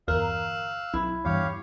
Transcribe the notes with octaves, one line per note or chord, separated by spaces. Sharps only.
G1 E2 A#4 F5 E6 F#6
B1 E4
E2 G2 G4 C#5 F5